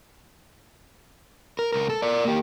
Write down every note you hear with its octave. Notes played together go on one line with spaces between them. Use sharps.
A#4
C#2 A#4
A4
A#4 D5
A#3 G4